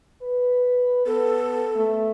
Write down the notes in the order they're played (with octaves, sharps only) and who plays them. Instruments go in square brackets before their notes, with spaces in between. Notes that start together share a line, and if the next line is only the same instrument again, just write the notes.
[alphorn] B4
[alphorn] B3 [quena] A4
[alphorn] A3